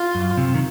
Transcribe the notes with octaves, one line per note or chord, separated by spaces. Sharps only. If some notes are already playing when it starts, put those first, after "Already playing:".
Already playing: F4
F#2
C3
D#3